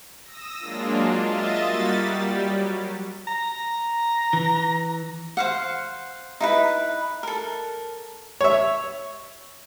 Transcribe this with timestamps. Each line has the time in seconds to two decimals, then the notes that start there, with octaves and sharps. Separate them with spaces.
0.23 D#6 E6 A#6
0.59 F#3 G#3 A#3 D4 F4
1.20 F4 D#5 E5 A6
1.62 G3 A#3 F#4 A6 B6
1.99 G3
2.44 F#3
3.28 A#5
4.33 E3
5.37 C5 F5 F#5
6.41 D#4 E4 B4
7.23 A4 A#4
8.41 C#5 E5